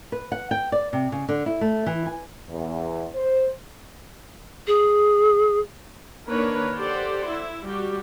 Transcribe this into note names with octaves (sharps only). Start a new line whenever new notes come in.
B4
F#5
G5
D5
C3
C#3
D3
E4
A3
E3
G#5
E2
C5
G#4
D#3 A#3 D4 A#4 B4 C#5
G4 A4 C5 D5 F#5
E4
G3 F#4 G4